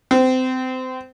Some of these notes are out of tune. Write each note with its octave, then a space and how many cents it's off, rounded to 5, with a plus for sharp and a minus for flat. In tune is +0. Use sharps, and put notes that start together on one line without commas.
C4 -25